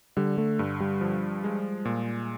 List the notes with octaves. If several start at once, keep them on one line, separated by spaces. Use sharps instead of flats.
D3 G3
A3
G2
G3
F3
G#3
A#2